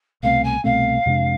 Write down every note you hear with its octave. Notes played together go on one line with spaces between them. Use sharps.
C2 B2 A3 C4 F5
G#5
C2 B2 A3 C4 F5
F2 C3 G#3 D4